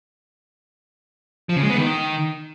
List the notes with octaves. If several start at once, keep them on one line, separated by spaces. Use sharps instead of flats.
F3
C#3
G#3
B3
D#3